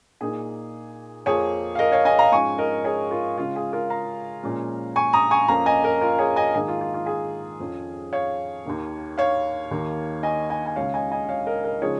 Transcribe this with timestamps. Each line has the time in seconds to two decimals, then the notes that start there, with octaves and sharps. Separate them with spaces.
0.21 A#2 A#3 D#4 G#4
1.26 F2 F3 A#3 G#4 C#5
1.75 F5
1.79 A#4 D#5
1.92 C#5 F5
2.05 D#5 G#5
2.19 F5 A#5
2.32 G#2 F3 C#4 G#5 C#6
2.58 A#4 D#5
2.84 G#4 C#5
3.11 F4 A#4
3.37 C#3 G#3 C#4 F4
3.56 G#4
3.73 F4 A#4
3.90 F5 A#5
4.43 A#2 F3 G#3 C#4
4.96 G#5 C#6
5.13 A#5 D#6
5.31 G#5 C#6
5.48 F2 F3 A#3 C#4 F5 A#5
5.66 D#5 G#5
5.83 A#4 D#5
6.01 F4 A#4
6.19 G#4 C#5
6.36 D#5 G#5
6.55 G#2 D#3 A#3 D#4 G#4
6.68 F4
6.81 F4
6.94 F4
7.06 G#4
7.60 F2 F3 C#4
8.13 C#5 F5
8.65 D#2 D#3 A#3
9.18 C#5 F5
9.71 D#2 D#3 A#3 D#4
10.23 D#5 G#5
10.50 D#5 G#5
10.66 G#5
10.76 C#2 C#3 G#3 C#5 F5
10.94 D#5 G#5
11.11 D#5 G#5
11.29 C#5 F5
11.46 A#4 D#5
11.64 A#4 D#5
11.82 C#3 F3 G#3 D#4 G#4 C#5